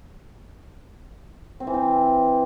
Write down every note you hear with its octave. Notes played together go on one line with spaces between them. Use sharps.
C4
E3
C4